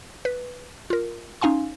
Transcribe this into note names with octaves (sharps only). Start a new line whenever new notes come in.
B4
F4 A#4
C#4 D#4 F5 G#5 C6